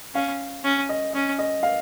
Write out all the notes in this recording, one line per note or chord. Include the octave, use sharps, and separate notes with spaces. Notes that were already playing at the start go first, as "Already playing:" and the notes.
C#4 F5
C#4
D#5
C#4 D#5
D#5
F5